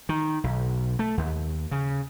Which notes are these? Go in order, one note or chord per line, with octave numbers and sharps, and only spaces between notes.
D#3
B1
A3
D#2
C#3